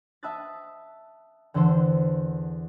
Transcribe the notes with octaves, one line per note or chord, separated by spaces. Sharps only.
E5 A5 B5 D#6 F#6 A6
E2 D3 E3 D4 A4 C5